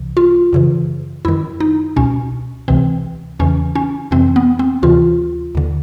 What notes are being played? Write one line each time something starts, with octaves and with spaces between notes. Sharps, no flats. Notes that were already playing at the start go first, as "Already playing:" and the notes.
Already playing: C2 C3 E3
F4
F#2 C#3 E3
F#2 D#3 E4
D#4
C#2 B2 C#4
C#2 C3 E3 C4
E2 C#3 E3 C#4
C#4
F2 C3 E3 C4
B3
C4
D2 C3 E3 F4
D#2 D3